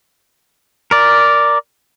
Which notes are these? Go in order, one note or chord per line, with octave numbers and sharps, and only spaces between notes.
A#4 D5